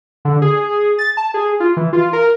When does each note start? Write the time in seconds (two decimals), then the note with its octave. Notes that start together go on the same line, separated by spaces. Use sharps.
0.25 D3
0.42 G#4
0.98 A6
1.17 A5
1.34 G#4
1.60 F4
1.77 E3
1.93 F4
2.13 A#4